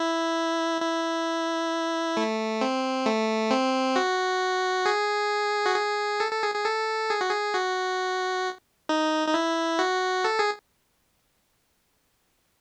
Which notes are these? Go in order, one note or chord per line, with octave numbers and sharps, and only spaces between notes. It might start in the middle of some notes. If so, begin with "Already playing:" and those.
Already playing: E4
E4
A3
C4
A3
C4
F#4
G#4
F#4
G#4
A4
A4
G#4
G#4
A4
G#4
F#4
G#4
F#4
D#4
D#4
E4
F#4
A4
G#4